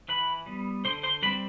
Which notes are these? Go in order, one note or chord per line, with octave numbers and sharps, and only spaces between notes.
E3 B4 B5
G3 B3
D3 C5 C6
C5 C6
G3 C4 B4 B5